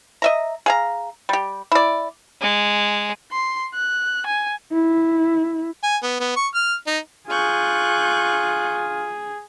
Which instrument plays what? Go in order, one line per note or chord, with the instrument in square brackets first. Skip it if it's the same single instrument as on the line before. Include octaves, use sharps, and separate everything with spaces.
[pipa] D#5 E5 A#5
G#4 F5 A#5
G3 G4
E4 D5
[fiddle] G#3
[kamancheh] C6
F#6
G#5
[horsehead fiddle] E4
[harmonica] G#5
B3
B3
C#6
F6
D#4
[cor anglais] F4 [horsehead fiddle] G#4 [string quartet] C#6 F#6 G6